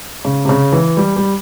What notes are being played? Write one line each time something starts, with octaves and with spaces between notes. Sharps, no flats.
C#3
C3
C#3
E3
G3
G3